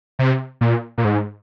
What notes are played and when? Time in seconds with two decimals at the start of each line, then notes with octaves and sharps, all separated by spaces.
0.19 C3
0.61 A#2
0.98 A#2
1.04 G#2